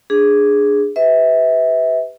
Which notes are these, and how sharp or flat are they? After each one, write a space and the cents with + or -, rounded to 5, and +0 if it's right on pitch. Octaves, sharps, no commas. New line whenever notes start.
D4 +0 G#4 +0
G4 +10 B4 +20 E5 -25